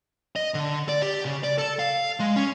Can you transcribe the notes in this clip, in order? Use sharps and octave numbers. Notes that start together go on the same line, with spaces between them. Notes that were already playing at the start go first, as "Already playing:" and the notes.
D#5
D3
D5
G4
C#3
D5
A4
F5
G#3
C#4